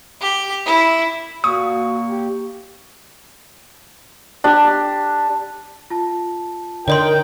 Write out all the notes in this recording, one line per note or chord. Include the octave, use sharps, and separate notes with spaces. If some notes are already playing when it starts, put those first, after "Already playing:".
G4
E4
A#2 F#4 C#6 D#6
G4
D4 G4
F4 A5
D3 D#4 A#4 C#5 D5 G5 C6